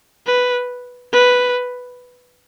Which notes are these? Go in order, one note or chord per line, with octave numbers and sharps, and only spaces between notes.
B4
B4